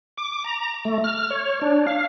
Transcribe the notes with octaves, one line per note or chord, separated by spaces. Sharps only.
D6
A#5
A3
F6
C#5
D4
F5